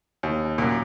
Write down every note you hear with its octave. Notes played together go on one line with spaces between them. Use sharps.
D#2
F#2 A#2